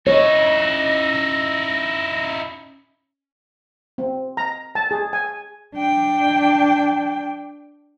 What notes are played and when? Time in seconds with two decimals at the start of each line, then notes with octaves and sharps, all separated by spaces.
0.07 C#4 D#4 E4 C#5 D#5 A#6
3.98 C4
4.37 A#5
4.75 A5
4.91 G#4
5.13 G#5
5.75 D4 G5